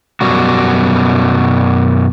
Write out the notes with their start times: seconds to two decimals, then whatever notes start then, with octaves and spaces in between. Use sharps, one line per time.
0.21 F#2 B2 G3 F#4